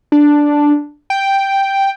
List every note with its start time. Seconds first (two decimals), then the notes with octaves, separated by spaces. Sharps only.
0.12 D4
1.10 G5